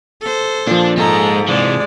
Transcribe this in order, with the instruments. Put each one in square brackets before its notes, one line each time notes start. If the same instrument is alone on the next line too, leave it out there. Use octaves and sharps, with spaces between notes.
[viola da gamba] A4 C5
[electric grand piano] A#2 F3 [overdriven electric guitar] D4
[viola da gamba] G#2 [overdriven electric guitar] G#3 [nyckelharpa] A4 A#5
[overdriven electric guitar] C3 E3 [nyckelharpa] G#3 D5